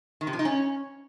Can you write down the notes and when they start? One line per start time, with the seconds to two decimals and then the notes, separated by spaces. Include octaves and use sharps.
0.21 D#3
0.27 C3
0.33 F3
0.39 D#4
0.45 C#4